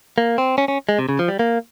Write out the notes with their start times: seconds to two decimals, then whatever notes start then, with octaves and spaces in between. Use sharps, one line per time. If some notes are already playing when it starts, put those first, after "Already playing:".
0.18 A#3
0.38 C4
0.58 C#4
0.68 C#4
0.89 G#3
0.99 C3
1.09 C#3
1.19 F3
1.28 G3
1.39 A#3